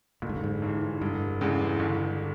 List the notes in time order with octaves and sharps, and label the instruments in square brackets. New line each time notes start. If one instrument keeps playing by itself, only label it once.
[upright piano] G1 [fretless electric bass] A#2
[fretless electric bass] G#2
G2
G#2
[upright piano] G2 E3
[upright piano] F1 [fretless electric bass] G2
[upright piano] E2 C#3 E3 G#3
G1